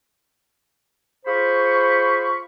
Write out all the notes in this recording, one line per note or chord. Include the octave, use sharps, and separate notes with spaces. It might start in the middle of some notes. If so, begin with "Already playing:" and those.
F4 G#4 C5 B5 C#6